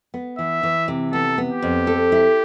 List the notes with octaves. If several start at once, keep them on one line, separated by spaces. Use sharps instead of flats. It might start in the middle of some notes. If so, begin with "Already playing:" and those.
B3
E3 E5
E3
C3
B3 A4
B3
G4
F2
A4
E4